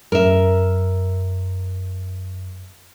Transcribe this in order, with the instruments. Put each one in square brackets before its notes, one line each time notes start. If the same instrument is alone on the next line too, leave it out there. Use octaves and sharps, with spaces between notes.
[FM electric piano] F#2 [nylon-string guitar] A#4 E5